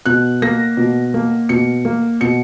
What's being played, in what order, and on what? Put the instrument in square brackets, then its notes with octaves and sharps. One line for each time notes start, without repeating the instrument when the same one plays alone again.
[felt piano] B2 F#6
A#3 A#6
B2
A#3
B2 C#7
A#3
B2 C#7